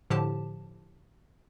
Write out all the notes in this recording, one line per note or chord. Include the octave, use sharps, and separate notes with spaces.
A2 D3 F3 G4 A5